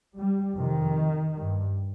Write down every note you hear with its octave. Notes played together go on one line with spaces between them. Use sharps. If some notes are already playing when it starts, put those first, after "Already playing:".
G3
F2 C3 D#3
G2